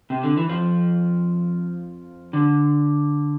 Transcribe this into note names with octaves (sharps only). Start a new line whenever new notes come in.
C3
D3
E3
F2 F3
D3